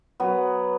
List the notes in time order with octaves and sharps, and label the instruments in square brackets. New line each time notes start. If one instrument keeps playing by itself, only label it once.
[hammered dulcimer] F#3 B3